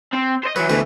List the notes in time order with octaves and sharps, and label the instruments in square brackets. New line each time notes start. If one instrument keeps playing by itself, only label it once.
[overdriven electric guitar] C4
C5 D#5
[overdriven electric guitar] E3 F#3 [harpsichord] B4
[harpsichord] D2 B4 [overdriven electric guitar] B2 E3